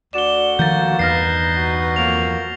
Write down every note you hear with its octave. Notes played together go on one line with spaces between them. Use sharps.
D2 F#4 D5 E7 G7
D#3 F3 G3 A#3 G6 A6
E2 G2 D#4 B4 F6 A#6 C7
F#4
F2 F#3 A#3 F7